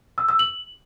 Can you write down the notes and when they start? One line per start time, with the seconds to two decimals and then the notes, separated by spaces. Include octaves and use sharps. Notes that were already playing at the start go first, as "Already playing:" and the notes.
0.18 E6
0.29 E6
0.39 F#7